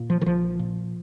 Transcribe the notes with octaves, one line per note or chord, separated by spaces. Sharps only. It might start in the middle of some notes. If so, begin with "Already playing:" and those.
Already playing: A#2
F3
D#3
A#1 F3
A#2